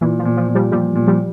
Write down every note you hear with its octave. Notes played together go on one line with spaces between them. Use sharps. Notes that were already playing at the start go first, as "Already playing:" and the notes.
A#2 E3
F3
A#2
F3
A#2
F3 G3
A#2 F3 G3
A#2
F3 G3